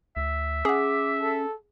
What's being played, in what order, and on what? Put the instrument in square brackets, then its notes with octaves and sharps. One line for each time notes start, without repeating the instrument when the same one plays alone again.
[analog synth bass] D2 [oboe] E5
[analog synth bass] C#4 [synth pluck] G#4 F#5 [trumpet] D6
[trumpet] A4